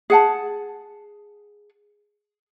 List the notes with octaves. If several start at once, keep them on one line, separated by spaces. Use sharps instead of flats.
G#4 F#5 A5